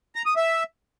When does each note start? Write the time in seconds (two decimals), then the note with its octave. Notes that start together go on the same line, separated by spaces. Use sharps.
0.15 A#5
0.26 D#6
0.36 E5